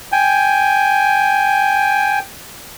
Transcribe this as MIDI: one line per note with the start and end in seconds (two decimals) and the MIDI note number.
0.12 2.19 79
0.12 2.19 80